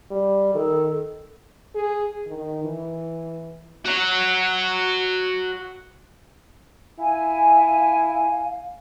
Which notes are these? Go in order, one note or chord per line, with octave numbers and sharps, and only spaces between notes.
G3
D#3 A4
G#4
D#3
E3
F#4 C#5
E4 F5 G#5